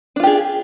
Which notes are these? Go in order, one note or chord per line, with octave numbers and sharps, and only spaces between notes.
D4 F4 G4 G#4